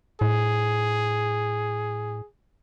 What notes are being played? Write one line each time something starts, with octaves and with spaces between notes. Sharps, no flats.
A2 G#4